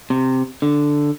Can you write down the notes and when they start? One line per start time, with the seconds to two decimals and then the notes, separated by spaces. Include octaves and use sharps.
0.10 C3
0.62 D3